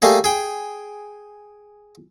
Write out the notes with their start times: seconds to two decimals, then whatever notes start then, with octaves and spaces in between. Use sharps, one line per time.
0.02 G3 A3 A#3 G#4
0.24 G#4 G5